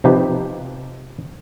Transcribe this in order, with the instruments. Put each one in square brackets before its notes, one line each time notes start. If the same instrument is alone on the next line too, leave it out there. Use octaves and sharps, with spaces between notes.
[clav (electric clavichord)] C3 F3 D#4 G4 B4